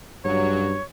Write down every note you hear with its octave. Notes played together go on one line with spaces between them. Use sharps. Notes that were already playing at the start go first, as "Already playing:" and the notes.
G2 C#3 F#3 C#5